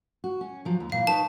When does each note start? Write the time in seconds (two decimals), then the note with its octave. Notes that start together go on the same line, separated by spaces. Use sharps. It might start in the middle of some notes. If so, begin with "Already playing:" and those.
0.24 F#4
0.41 C#4
0.65 F3 F#3
0.80 D#2
0.92 A#2 E3 F5
1.07 D#4 B4 C#5 A5